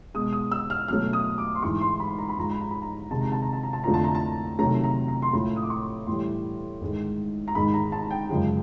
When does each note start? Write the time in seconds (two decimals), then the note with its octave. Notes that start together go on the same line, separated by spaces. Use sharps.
0.14 B2 G#3 D#6
0.33 D#6
0.52 E6
0.70 F6
0.88 B2 F#3 A3 F6
1.13 D#6
1.38 D6
1.55 C6
1.62 G#2 E3 G#3 C#6
1.81 C6
2.00 B5
2.18 A#5
2.29 B5
2.37 G#2 F3 G#3 A#5
2.50 B5
2.61 A#5
2.71 B5
2.82 A#5
3.11 C3 D#3 G#3 A5
3.21 A#5
3.32 A5
3.42 A#5
3.53 A5
3.63 A#5
3.73 A5
3.84 F2 D3 F3 A3 A#5
3.94 A5
4.04 A#5
4.15 A5
4.59 C3 D#3 F#3 A3 A#5
4.84 A#5
5.08 A#5
5.22 C6
5.33 A2 F3 A3 B5
5.56 D#6
5.63 D6
5.70 C#6
6.07 A2 E3 G3 C6
6.81 G#2 D#3 G#3
7.48 A#5
7.55 G#2 D#3 G#3 B5
7.74 A#5
7.92 A5
8.11 G5
8.29 F#2 C#3 F3 G#3